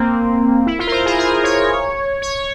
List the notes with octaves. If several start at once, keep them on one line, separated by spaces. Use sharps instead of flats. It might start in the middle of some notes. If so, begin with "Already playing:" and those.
Already playing: A#3 C4
E4
F4
A#4
C5
G#4
A#4
C#5
C#5